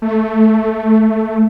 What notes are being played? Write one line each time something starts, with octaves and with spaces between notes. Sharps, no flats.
A3